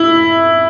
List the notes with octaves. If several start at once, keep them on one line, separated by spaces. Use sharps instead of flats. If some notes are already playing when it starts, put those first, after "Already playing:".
Already playing: E4